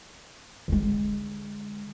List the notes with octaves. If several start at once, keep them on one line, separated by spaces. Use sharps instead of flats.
D3 G#3